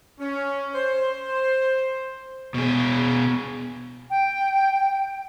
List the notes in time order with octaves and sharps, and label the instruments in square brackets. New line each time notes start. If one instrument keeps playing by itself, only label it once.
[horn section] C#4
C5
[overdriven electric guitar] B2 G#4
[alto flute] G5